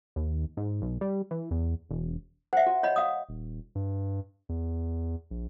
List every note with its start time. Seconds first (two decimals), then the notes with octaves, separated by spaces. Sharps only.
0.16 D#2
0.57 G#2
0.82 B1
1.01 G3
1.31 E3
1.51 E2
1.89 E1
2.53 C5 E5 F#5
2.67 F#4
2.83 C#5 D#5 B5
2.96 F5 D#6
3.29 D#1
3.75 G2
4.49 E2
5.31 A#1